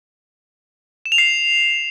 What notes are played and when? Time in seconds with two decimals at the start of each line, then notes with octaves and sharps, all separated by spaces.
1.06 E7
1.12 F7
1.18 C7